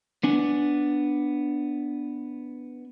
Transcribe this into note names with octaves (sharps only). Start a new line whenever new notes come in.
B3 D4 G#5